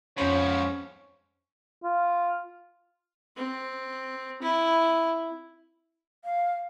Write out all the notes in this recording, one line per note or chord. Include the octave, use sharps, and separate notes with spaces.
F2 G#2 F3 C#4 C5 C#5 B5
F4
C4
E4
F5